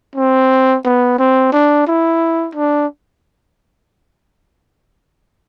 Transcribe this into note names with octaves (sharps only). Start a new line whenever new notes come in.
C4
B3
C4
D4
E4
D4